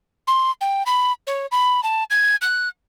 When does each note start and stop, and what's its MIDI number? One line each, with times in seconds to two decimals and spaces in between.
0.27 0.51 84
0.61 0.83 79
0.86 1.12 83
1.27 1.46 73
1.52 1.81 83
1.83 2.04 81
2.10 2.36 92
2.42 2.69 90